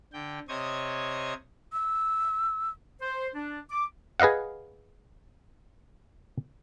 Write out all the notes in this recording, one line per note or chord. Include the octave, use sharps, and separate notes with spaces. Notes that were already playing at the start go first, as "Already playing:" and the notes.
D3 G5
C3 C5 C#5 D#5 D#6 G#6
E6
C5
D4
D6
G#4 B4 D#5 F5 F#5